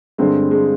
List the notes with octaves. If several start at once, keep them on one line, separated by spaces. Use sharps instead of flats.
G2 D3 G3 G#3 C4
G#3